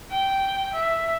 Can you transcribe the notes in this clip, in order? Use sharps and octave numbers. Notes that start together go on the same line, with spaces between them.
G5
E5